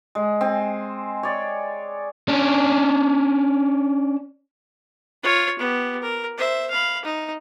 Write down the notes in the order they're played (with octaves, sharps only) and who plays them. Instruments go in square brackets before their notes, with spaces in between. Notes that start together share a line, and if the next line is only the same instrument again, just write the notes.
[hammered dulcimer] G#3
C4 G#5
C#5 D5
[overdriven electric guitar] C#4 D4
[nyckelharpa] F4 C#5
B3 G4
A#4
C5 E5
F5 B5
D#4